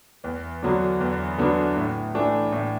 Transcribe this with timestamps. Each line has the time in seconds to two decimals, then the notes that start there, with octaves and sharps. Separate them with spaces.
0.24 E2
0.63 D3 F#3 B3 D4
1.00 E2
1.38 D3 F#3 B3 D4
1.77 A2
2.15 E3 A3 D4
2.52 A2